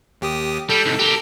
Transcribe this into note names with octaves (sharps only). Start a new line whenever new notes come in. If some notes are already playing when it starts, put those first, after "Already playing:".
D#2 G4 D#6
G3 A4
C2 G#2
G4 A#4